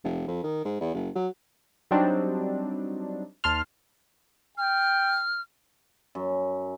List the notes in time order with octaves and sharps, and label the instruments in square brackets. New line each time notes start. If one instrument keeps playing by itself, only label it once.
[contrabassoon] F1
F2
D#3
G#2
E2
F#1
F#3
[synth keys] F#3 G3 C4 D4 D#4
D#2 A5 C6 F6
[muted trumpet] G5 [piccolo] F6
[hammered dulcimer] F#2